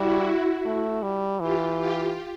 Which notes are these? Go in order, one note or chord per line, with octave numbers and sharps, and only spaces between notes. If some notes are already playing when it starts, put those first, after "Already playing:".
Already playing: G3 E4 F#4
A3
G3
E3 F4 G4
F4 G4